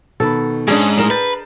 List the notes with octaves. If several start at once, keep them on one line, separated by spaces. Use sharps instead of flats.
B2 D#3 A4 B5
G#2 C#4 D4 G#4
A2 A#4 D#5 C7 E7
B4 G6 A6